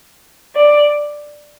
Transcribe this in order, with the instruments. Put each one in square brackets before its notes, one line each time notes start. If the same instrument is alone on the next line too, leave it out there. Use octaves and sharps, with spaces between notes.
[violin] D5